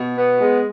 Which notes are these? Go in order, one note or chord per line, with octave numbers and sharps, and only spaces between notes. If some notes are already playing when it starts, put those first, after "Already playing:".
Already playing: B2
B3
G#3